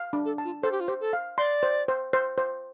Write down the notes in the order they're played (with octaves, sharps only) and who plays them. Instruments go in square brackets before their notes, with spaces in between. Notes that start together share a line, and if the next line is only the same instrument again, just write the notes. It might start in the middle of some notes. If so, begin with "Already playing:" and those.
Already playing: [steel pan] F5
D4
[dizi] A4
[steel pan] A5
[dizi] F4
[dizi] A4 [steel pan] C5
[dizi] G4
F4
[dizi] G4 [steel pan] C5
[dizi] A4
[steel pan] F5
[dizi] D5 [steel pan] C6
[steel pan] C5
C5
C5
C5